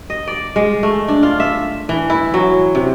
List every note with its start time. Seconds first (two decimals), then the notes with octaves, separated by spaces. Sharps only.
0.10 D#5
0.27 D5
0.56 G#3
0.83 A3
1.08 D4
1.23 F4
1.40 E5
1.89 E3
2.10 E4
2.34 F#3
2.75 C3